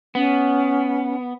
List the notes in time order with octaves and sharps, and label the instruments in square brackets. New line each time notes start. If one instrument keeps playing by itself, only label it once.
[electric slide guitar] B3 [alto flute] C#4